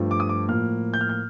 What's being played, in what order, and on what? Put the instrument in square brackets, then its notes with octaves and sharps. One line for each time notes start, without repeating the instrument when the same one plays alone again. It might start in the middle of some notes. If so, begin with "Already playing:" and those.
Already playing: [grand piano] G2 F3 A3
D6
D#6
D6
A2 F3 A#3 F6
G6
F6
G6